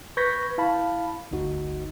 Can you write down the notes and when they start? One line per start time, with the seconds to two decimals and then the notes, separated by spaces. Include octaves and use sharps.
0.17 B4 C#6 G6 G#6 A#6 B6
0.58 E4 F5 A5 B5
1.31 G1 D2 D#4 F#4